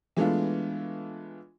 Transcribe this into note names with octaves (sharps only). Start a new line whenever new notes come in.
E3 G#3 A3 B3 D4 F4